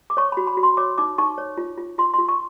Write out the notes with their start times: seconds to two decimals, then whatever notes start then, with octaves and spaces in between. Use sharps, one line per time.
0.10 D6
0.17 C#5 C#6
0.32 B5
0.37 F#4
0.47 B5
0.57 F#4
0.63 C6
0.77 C#5 D6
0.98 D#4 D6
1.18 D#4 C#6
1.38 C#5
1.57 F4
1.78 F4
1.98 F4 C6
2.14 C6
2.18 F4
2.29 C#6